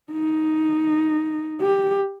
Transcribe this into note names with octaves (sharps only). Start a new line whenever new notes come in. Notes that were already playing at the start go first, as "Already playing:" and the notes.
D#4
G4